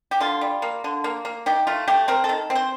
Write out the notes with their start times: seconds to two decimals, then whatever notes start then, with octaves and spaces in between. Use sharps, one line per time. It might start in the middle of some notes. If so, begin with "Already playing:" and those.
0.11 G4
0.20 D3 F4
0.41 G3
0.62 A#3
0.84 D3
1.04 A#3
1.25 A#3
1.46 D#3 G4
1.67 A3 F4
1.88 A3 G4
2.08 C4 A#4
2.24 A4
2.29 D#3
2.50 C4
2.55 C5